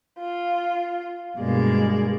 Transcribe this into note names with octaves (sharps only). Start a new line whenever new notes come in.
F4
G2 B2 G#3 A#3 D5